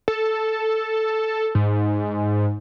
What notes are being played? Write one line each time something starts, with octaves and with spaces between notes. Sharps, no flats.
A4
G#2